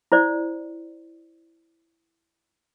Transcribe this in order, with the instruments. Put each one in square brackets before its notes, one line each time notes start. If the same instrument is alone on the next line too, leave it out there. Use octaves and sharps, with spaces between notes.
[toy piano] E4 C5 D5